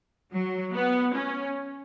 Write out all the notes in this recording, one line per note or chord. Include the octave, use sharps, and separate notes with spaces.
F#3
B3
C#4